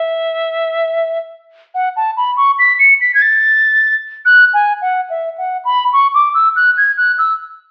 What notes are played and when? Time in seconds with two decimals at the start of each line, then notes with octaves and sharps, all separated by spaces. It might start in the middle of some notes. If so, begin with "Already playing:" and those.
Already playing: E5
1.74 F#5
1.96 A5
2.17 B5
2.37 C#6
2.59 B6
2.79 C#7
3.01 B6
3.14 G#6
3.22 A6
4.25 F#6
4.53 G#5
4.81 F#5
5.10 E5
5.38 F#5
5.65 B5
5.93 C#6
6.14 D6
6.34 E6
6.56 F#6
6.77 G#6
6.97 F#6
7.18 E6